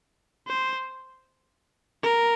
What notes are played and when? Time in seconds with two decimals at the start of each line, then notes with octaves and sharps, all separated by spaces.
0.47 C5
2.03 A#4